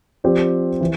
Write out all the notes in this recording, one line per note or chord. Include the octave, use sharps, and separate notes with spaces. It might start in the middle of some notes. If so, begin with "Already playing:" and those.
F3 C4 G4 D5
E3